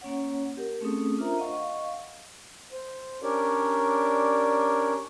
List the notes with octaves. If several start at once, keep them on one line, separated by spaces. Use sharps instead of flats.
A#3 C#4 C#5 F#5
G4 A#4
A3 C4 C#4 G#4 A4 D#6
D4 F4 A#4 C5 E5 A#5
D#5 F5 F#5 C#6
C5
C#4 D4 G4 A#4 C#5 D5